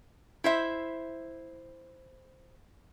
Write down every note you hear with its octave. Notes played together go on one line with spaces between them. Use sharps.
E4 C5 E5